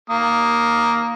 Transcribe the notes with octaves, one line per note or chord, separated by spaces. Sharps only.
A#3 D#6